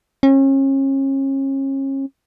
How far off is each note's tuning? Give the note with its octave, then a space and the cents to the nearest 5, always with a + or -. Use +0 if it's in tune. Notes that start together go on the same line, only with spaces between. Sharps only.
C#4 -35